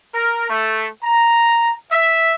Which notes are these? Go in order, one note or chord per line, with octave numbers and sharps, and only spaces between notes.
A#4
A3
A#5
E5